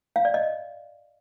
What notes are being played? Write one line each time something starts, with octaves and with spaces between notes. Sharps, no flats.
F5
D5
D#5